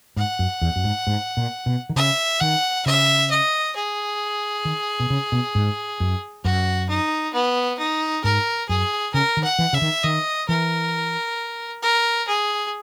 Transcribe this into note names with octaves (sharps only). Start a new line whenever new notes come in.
G#2 F#5
F#2
E2
F#2
G#2
G#2
A#2
B2
D#3
C#3 E5
D#3 F#5
C#3 E5
D#5
G#4
D#3
B2
C#3
B2
G#2
F#2
F#2 F#4
D#4
B3
D#4
G#2 A#4
F#2 G#4
C#3 A#4
D#3
F#5
E3
C#3 E5
D#3
D#3 D#5
E3 A#4
A#4
G#4